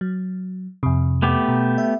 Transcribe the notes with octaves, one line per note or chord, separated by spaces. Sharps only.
F#3
F2 C3
A3 B3 G4
B2
E5